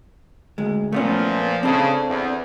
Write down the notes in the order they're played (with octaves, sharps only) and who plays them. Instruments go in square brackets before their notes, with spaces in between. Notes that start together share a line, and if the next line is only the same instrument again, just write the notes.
[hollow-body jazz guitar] D2 G#3
[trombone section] A#2 F3 [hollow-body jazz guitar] A3 B3 C#4
[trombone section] C#3 [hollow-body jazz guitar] C4 D4 A4
[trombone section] E2